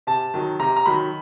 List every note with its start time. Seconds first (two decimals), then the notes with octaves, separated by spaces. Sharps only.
0.07 C3 A5
0.34 D#3 F#3
0.59 C3 A#5
0.76 A#5
0.86 D#3 F#3 B5